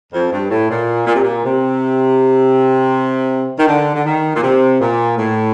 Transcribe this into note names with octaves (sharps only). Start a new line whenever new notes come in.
F2
G2
A2
A#2
A#2
C3
A#2
C3
D#3
D3
D3
D#3
A#2
C3
A#2
A2